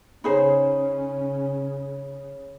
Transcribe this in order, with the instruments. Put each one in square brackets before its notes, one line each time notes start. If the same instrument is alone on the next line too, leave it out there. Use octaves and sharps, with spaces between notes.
[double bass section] C#3 [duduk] C#4 [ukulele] D#4 G#4 C5 [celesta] C#5 B5